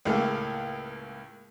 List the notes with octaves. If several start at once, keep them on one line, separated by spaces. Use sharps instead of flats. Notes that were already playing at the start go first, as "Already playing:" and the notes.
C#2 A2 A#3 G#4 A4